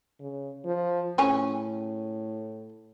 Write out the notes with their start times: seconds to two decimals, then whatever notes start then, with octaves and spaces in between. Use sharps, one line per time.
0.20 C#3
0.65 F3
1.18 A2 C#3 C#4 G#5